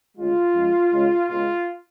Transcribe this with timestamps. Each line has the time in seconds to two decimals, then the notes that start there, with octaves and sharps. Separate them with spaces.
0.17 D2 C#3 G#3 F4
0.54 F#2 F3 G#3
0.91 C#2 C#3 G#3
1.29 C#2 B2 G#3 F4